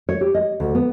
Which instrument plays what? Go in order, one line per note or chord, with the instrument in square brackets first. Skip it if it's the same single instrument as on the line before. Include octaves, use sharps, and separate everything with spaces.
[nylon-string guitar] C#5
G4
D#5
D2
B3